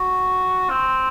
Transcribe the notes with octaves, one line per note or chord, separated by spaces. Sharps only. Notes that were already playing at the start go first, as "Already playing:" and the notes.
Already playing: F#4
C4